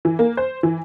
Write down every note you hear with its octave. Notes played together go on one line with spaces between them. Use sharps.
E3
A#3
C5
E3